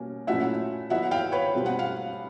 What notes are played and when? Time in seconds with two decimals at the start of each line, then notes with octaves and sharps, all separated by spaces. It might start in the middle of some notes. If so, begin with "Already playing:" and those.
Already playing: B2 G3 A#3 C#4
0.27 A#2 F#3 A3 C#4 E4 E5 F#5
0.90 F#3 B3 E4 E5 F#5
1.11 F5 G5
1.32 B4 C#5
1.53 B2 G3 C4
1.66 F#5
1.79 F5